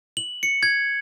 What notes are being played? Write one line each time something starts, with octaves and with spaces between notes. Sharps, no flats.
F#7
C#7
G#6